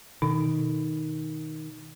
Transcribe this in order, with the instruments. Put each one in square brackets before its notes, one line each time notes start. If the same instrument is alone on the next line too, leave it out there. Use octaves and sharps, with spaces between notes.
[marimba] B2 [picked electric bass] D#3